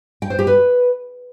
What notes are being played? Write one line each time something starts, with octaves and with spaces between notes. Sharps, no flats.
G5
C5
G4
B4